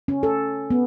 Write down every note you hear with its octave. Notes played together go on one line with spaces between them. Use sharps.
C#4
A4
B3